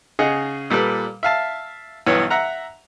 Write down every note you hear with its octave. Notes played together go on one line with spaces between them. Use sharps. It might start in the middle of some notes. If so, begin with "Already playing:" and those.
C#3 G#4 D#5 F#5
A#2 G3 A4 B4
E5 F5 A5
B1 G2 E3 B3 C#5
E5 F#5 A#5